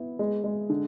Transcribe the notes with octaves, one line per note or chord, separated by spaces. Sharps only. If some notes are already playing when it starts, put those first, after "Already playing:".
Already playing: B3 E4
G#3
G#3
D3